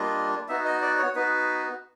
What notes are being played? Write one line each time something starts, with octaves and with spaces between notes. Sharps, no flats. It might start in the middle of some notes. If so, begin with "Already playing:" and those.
Already playing: G3 A#3 D4 F4 D#5
B3 D#4 F#4 E5
D#5
D5
C#5
B3 D#4 F#4 B4